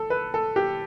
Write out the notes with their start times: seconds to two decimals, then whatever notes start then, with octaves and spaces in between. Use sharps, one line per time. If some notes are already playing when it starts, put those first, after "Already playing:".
Already playing: A4
0.10 B4
0.34 A4
0.56 G4